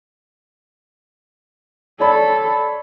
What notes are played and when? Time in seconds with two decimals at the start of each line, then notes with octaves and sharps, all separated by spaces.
2.00 A4 C#5 D5 B5